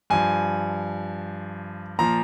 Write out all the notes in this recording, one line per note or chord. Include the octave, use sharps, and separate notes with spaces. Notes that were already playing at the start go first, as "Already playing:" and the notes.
G2 F3 G#5
A#2 F3 A#5